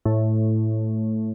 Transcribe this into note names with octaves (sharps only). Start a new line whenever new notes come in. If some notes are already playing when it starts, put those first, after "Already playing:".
A2